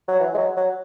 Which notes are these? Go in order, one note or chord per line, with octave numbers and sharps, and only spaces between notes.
F#3
E3
G#3
F#3
F#3